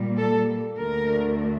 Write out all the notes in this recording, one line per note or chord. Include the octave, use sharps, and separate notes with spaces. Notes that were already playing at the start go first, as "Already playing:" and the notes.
Already playing: A#2 G3 A#3
A4
D2 D3 A3 A#4